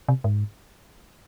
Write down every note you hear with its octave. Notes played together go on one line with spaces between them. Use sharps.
C3
G#2